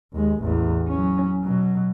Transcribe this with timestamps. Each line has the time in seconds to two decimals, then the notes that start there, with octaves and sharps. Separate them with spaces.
0.13 D#2 G#3
0.41 A1 E2
0.88 F#3 C#4
1.44 B2 F#3